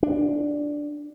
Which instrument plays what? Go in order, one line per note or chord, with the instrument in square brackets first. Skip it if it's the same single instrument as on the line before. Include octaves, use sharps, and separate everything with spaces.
[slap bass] D4